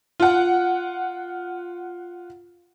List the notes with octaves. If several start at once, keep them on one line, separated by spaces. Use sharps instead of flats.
F4 F#5